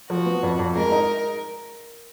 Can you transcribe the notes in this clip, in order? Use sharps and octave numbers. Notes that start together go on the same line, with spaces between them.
F3 F#4
B3
F2
F2
G#3 A#4
D#4